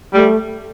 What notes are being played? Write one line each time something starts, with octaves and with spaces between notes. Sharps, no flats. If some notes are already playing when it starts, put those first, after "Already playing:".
G3 A3